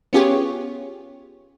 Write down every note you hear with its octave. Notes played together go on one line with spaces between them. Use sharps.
B3 C#4 F4 G4 G#4 C#5